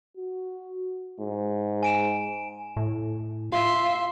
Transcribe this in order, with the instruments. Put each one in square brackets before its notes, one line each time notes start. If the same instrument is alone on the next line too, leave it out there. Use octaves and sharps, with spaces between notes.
[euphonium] F#4
G#2
[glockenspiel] G#5 D7 E7
[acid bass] A2
[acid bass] F4 [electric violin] E5 C6 [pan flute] F5